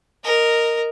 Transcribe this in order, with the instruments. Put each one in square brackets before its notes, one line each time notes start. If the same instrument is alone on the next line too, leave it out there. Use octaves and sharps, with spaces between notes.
[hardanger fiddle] A#4 D#5